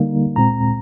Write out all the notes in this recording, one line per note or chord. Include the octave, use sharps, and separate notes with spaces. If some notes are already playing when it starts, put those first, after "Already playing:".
Already playing: D3 G3 A#3 D#4
A#2 G#3 C4 A#5